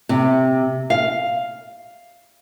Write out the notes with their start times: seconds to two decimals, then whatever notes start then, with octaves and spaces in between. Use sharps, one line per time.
0.09 C3
0.90 F5